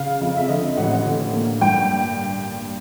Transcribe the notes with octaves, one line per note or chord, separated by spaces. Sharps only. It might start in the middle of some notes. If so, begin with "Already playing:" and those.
Already playing: C#3 F5
F2
E5
D3 D#5
A1 F#5
D3
A#3
G2 G5